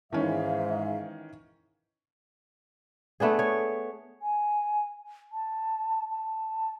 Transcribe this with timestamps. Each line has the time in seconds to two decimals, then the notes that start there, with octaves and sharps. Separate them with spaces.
0.12 G#2 D#3 E3 C#4 E5 F5
3.20 A3 B3 D4 G#4
3.39 C#5
4.22 G#5
5.32 A5
6.10 A5